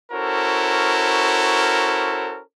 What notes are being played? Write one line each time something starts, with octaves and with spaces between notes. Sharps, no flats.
C#4 E4 F#4 A4 A#4 C5